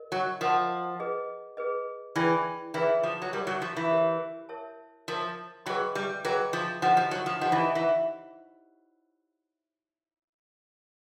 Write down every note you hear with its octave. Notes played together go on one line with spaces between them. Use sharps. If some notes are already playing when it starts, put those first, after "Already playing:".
Already playing: A#4 D#5
F#3
F3 A#4 D#5 F#5 A5 C6
G#4 B4 D#5
G#4 B4 D#5
E3 E4 G#4 B4 D5 G5
E3 E4 G#4 B4 D5 G5
F3
F#3
G3 G4 A#4 C#5
F#3
F3
E3
G4 A#4 C#5
A#4 C#5 E5 A5
F3 A#4 C#5 E5 A5
F#3 G#4 B4 D#5 G5 B5
G3
F#3 G#4 B4 D#5 G5 B5
F3
F3 D#4 G4 C5 D#5 F#5
F3
F#3
F3
F3 D#4 G4 C5 D#5 F#5
E3
E3